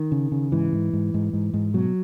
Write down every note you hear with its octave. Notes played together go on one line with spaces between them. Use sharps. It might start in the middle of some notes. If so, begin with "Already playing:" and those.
Already playing: D#3
C#3
C#3
G#2 E3
G#2
G#2
G#2
G#2
G#2
B2 F#3